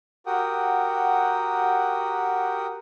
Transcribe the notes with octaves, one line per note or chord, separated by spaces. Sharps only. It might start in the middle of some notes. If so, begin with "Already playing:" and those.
F#4 G4 A#4 F#5 G5 D#6